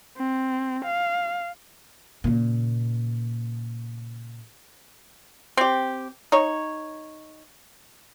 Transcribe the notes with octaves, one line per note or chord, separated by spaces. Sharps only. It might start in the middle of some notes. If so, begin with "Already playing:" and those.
C4
F5
A#2 C#3
C4 G4
D#4 C#5